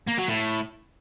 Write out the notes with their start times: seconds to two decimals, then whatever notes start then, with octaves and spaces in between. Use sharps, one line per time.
0.07 A#3
0.18 F#3
0.28 A2